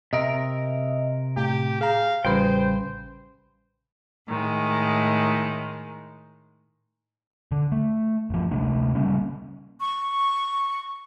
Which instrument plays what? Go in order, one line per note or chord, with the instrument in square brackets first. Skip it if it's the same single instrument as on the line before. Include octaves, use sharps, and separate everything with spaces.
[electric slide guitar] C3 A#4 [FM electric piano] D#5 E5
[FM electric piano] A2 [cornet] G4
[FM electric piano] G#4 A#5 [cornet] F5
[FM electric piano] A1 G3 B4 [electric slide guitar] C#3 G5 [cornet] C5
[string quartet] A2 D#3 G#3
[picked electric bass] D3
A3
G1 F3
D2 C3 A3 D4
C#3 G3 A#3 C#4
[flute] C#6